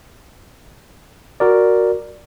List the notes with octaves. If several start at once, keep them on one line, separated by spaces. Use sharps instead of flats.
F#4 A#4 D5